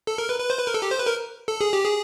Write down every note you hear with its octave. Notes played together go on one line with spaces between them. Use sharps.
A4
A#4
B4
B4
C5
B4
A#4
A4
G4
C5
B4
A#4
A4
G#4
G4
G#4